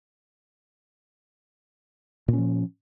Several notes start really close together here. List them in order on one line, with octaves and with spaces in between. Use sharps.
A#2 C#4 F3